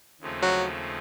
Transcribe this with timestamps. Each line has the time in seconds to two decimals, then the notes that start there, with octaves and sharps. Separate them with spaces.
0.21 D#2 C#3 F3 A3 C4
0.42 F#3